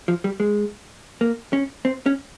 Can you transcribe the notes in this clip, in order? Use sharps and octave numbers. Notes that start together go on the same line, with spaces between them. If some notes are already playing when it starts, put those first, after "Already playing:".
F3
G3
G#3
A#3
C#4
C4
C#4